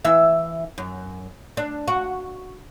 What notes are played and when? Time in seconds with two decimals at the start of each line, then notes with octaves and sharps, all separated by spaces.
0.05 E3 E5
0.78 F#2
1.57 D4
1.88 F#4